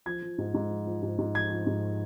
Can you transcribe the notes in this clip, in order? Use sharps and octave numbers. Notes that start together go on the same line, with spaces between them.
F3 G#6
F3
G#2
G#2
F3
F3
G#2
G#2
F3 G#6
F3
G#2